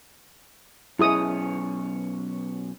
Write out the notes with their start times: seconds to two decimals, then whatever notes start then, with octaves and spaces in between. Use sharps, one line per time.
0.99 B1 C#4 E4 G#4 D#6